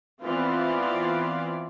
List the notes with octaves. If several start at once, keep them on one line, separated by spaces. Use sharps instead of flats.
E3 B3 C4 F4 D5